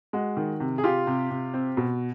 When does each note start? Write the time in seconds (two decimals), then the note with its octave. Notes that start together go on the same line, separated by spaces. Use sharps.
0.13 G#3 F#4
0.37 D#3
0.60 C3
0.78 G#4
0.84 C3 F4 G4
1.07 C3
1.31 C3
1.54 C4
1.77 B2